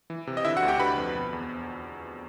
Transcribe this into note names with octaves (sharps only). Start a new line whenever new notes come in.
E3
C3
D#5
D3 E4 E5
F#4 F#5
D2
G4 G5
D3 B4 B5
F2
B2
E2